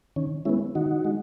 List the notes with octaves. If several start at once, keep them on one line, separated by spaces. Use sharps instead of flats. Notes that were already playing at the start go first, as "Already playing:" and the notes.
D#3 C#4
G#3 B3 C#4 E4
D#3 D#4 F#4
G#3